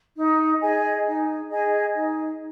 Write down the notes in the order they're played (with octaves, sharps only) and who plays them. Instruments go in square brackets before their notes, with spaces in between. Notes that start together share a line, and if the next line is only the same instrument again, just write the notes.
[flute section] D#4
G#4 D#5 G#5
D#4
G#4 D#5 G#5
D#4